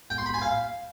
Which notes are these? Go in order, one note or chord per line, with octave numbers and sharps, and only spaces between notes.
G5
C6
B5
G#5
F5